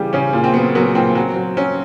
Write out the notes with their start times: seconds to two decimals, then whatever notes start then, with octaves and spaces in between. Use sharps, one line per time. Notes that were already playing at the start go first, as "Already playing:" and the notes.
Already playing: C#3 E3 G3 G4 G#4
0.13 C#3 C#4
0.33 A#2
0.44 C4
0.54 F#3 B3
0.75 F#3 B3
0.95 A#2 C4
1.15 F#3
1.36 F#3
1.57 F#3 C#4